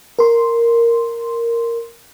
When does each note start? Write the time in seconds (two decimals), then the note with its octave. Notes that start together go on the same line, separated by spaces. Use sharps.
0.19 A#4 C6